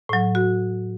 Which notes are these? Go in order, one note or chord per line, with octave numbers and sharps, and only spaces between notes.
A2 F#3
F#4